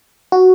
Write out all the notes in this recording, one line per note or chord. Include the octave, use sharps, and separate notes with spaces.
F#4